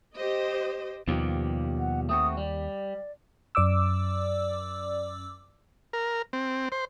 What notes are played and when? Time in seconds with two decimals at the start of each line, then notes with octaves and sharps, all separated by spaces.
0.16 G4 C5 D#5
1.08 D#2 B2 F3 G3
1.79 F#5
2.09 A3 C4 F#4 D#6
2.37 G3 D5
3.55 F#2 D5 D6 E6
5.93 A#4
6.33 C4
6.72 C5